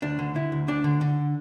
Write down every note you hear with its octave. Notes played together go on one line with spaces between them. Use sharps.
D2 D4
D3
D3 E4
D2
D2 D4
D3
D3